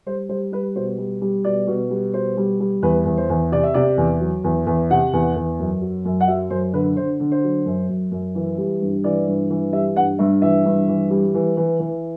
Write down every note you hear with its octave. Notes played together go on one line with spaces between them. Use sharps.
G3 C5
G3 C5
G3 B4
B2 C5
G3
G3
B2 D5
B2
G3
B2 C5
G3
G3
E2 B4
E2
C5
E2
C3 D5
E5
C3 D5
E2
F#3
E2
E2
C3 F#5
E2
E2
F#2
F#3
F#2
F#5
F#3 E5
F#2 C5
D3 B4
D3 C5
D3
C5
F#3
F#2
F#2
F#2
E3
G3
G2
E3 D5
G2
E3
G3 E5
G2 F#5
G2 E5
E3 E5
G2
E3
G3
E3
E3
E3